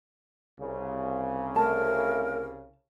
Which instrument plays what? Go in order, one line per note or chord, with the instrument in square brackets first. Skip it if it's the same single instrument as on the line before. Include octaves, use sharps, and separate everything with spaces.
[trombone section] C2 C#3
[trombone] A3 [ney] A#4 [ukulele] A5